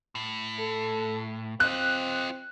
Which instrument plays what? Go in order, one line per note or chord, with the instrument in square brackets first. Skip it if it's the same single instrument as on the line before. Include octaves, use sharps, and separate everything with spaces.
[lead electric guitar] A2
[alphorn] A4
[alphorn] C4 [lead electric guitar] F4 D#5 [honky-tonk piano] F#6